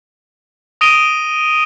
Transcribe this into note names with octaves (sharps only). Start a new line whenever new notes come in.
D#6 A#6 D7 D#7 F7 G7